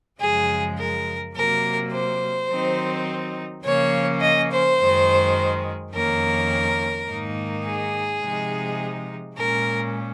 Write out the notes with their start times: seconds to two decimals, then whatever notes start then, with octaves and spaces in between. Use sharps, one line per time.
0.20 F#2 C#3 F3 G#3 G#4
0.77 A#4
1.34 C3 F#3 A#3 A#4
1.91 C5
2.50 D#3 F#3 C4 D#4
3.64 C#3 F3 A#3 C#4 C#5
4.20 D#5
4.50 C5
4.79 F#2 D#3 G#3
5.92 F2 D#3 A#3 C#4 A#4
7.07 G#2 D#3 A#3 D#4
7.64 G#4
8.22 C3 F3 G#3 D#4
9.36 A#2 G#3 C#4 A#4